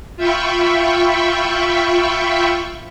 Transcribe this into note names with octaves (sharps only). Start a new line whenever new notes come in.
F4 E5 G5 B5 C#6